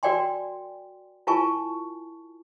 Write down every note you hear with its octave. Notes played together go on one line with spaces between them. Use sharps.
F#4 A#4 D5 G5 G#5 C6
E4 F4 A#4 G#5 A5 C#6